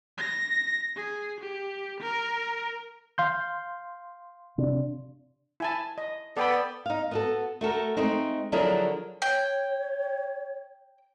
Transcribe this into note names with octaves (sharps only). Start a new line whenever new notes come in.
A#6
G#4
G4
A#4
F5 C6 G6
C3 D4
E4 G#5 A5
D#5
B3 A4 D5 G5 B5
D#4 F5
B3 F#4 A4
A3 F#4 A4 A#4
G#3 A3 C4 D#4
D3 F3 F#3 E4 G#4 A#4
C#5 G5